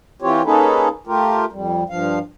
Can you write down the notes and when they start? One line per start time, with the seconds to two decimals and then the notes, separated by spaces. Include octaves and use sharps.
0.22 E3 C4 F4 G4 C#5
0.45 A#3 C#4 D#4 G#4 A4 B4
1.07 A3 F4 G4 A#4
1.52 F2 G3
1.89 G2 F3 F5